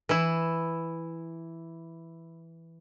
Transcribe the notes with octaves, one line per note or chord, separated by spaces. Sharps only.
E3 E4